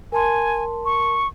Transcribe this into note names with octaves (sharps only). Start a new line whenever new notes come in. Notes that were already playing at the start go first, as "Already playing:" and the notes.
A#4 G#5 A5 C6
C#6